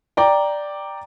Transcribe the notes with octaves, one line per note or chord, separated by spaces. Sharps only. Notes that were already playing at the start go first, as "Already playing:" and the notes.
D5 G5 A#5